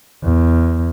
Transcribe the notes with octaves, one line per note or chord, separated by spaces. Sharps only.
E2